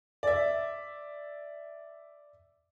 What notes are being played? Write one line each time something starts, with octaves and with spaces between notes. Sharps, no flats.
D5 E5